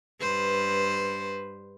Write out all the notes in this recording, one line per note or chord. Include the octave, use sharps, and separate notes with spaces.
G2 B4 C5